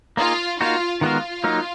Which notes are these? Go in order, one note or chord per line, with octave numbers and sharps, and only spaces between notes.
A#3 D#4 F4 G#4
A#3 D#4 F4 F#4
D#3 G#3 B3 F4 F#4 A#4
F#3 A#3 D#4